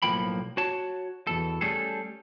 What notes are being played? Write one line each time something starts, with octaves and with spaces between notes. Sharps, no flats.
B1 A2 F3 A#3 G5 B5
F#4 C#5 A5
E2 B2 A4
G3 A3 C#4 G#4 A4